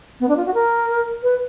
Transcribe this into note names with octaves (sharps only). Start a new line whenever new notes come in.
B3
D4
F4
F#4
A#4
B4